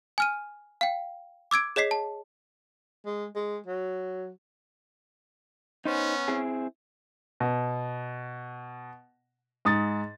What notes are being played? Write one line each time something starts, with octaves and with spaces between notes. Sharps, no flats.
G#5 F6 D#7
F5 G5
D6 E6 G#6 D7
G#4 C#5 D#5 B6 C7
A5
G#3
G#3
F#3
B3 C#4 D#4 C5
C4 E4 G#4
B2
G#2 D#6 A6